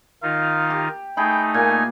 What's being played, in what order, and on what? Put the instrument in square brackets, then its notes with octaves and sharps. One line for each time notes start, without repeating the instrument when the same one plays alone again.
[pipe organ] D#3 D#4 F4 [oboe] F5
[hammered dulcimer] G4
[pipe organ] A3 D#4 [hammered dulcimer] G#4 B5 [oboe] G5
[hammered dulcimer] A#2 [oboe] G#5